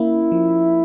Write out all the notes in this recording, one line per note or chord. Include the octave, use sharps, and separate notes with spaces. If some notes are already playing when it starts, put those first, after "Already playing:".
Already playing: A#3 C#4 E4
F3